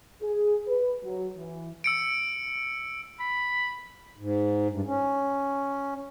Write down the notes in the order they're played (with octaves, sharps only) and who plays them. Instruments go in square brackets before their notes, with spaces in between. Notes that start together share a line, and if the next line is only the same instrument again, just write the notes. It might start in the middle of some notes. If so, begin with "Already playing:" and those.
[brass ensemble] G#4
B4
F#3
E3
[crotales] E6 C#7 D7
[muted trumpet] B5
[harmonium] G#2
G2
C#4